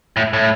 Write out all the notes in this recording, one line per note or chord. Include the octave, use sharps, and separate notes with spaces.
A2
A2